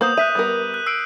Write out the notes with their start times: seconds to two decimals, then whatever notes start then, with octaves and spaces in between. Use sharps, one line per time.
0.01 A#3 B3 C5 D#6 G6 F#7
0.18 E5 F#6 B6 D#7
0.35 G3 B3 A#4
0.74 F#6
0.87 E6 C7 D7